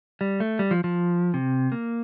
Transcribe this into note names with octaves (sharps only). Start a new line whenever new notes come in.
G3
A3
G3
F3
F3
C3
A#3